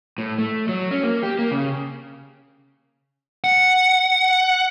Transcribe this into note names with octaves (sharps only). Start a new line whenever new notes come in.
A2
A3
F#3
C#4
A#3
G4
A#3
C#3
F#5